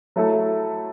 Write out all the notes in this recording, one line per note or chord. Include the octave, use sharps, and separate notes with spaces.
F#3 A3 E4 A4